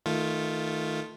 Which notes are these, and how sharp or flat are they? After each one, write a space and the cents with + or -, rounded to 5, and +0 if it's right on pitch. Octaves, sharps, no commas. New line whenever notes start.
D#3 +20 A3 +0 F4 +0